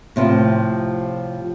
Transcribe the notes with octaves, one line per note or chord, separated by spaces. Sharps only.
A2 C3 F3